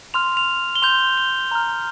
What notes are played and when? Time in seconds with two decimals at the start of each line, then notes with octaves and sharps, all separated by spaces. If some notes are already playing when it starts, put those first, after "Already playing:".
0.14 C6 F6 F7
0.37 F7
0.75 G7
0.82 C6 G6 F7
1.17 G7
1.51 A#5 F6